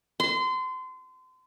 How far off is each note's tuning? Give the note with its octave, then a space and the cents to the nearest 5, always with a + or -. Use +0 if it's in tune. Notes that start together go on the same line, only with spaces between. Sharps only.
C6 -30